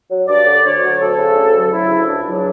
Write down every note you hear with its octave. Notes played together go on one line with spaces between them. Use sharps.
F#3
G2 D5
D3
D2 C#5
F#3
D2 A4
C#3
D2
F#3
D2 E4
C#3
C#2 D4
F#3